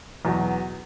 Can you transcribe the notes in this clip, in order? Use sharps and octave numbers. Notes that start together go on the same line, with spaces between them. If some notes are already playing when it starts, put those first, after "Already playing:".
E2 B2 F#3